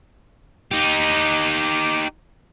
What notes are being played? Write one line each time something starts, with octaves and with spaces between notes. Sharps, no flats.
D#4 G4